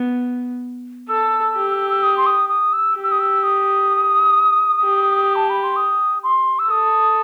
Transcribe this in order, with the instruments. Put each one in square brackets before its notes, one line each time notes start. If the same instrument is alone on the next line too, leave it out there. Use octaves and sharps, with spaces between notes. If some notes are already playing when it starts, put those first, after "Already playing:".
Already playing: [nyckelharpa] B3
[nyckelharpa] A4 [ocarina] E6
[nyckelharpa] G4
[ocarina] E6
D#6
C6
D#6
D#6
E6
[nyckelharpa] G4
[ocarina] E6
D#6
E6
D#6
[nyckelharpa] G4
[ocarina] A5
B5
C6
D#6
C6
E6
[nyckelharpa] A4 [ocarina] D#6